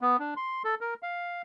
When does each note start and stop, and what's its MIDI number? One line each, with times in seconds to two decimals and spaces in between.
0.01 0.17 59
0.19 0.34 62
0.37 0.63 84
0.64 0.75 69
0.81 0.94 70
1.03 1.42 77